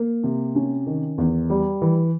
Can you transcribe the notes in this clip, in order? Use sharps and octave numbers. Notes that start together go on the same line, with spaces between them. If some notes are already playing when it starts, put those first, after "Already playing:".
Already playing: A#3
C3
C#4
D#3
E2
G3
E3